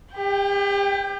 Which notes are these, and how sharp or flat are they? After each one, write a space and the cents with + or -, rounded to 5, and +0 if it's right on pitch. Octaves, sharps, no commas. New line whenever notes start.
G4 +35 G5 +0